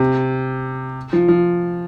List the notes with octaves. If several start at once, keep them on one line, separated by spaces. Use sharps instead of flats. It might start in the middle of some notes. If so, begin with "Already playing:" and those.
Already playing: C3
F3
F3